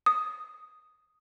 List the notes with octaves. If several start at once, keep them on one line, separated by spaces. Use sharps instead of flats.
D#6